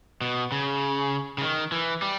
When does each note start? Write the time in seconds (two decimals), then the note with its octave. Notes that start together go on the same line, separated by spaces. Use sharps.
0.21 B2
0.52 C#3
1.38 C#3
1.42 D#3
1.72 E3
2.02 G3